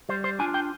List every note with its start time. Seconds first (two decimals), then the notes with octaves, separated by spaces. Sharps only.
0.09 G3 C5
0.24 C5
0.39 D4 F4 G#5
0.54 G5